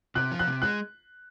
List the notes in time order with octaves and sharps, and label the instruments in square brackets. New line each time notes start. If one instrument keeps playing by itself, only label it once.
[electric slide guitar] C3 [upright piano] F#6
[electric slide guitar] F3
[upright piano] F#6
[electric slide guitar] C3
[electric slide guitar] G#3 [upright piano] F#6